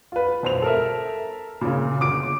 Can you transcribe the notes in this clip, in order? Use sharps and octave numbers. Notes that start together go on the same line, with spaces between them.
F4 B4
B1 C5 F7
A4 A#4 E5
A#2 C#3
G1 D6 D7